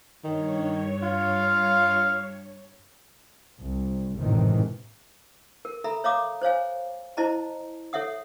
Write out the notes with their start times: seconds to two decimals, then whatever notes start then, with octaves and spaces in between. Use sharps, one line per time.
0.24 G2 D#3 C#5
1.03 F4 F5
3.60 C2
4.19 G#1 F#2 A2 C3 D#3 E3
5.65 A#4
5.84 A4 E5 A#5 B5
6.04 C#5 E5 F5 A#5 D6 D#6
6.42 C5 C#5 F5 G#5
7.17 E4 C5 D#5 A5 A#5
7.93 A4 C#5 E5 F#5 D#6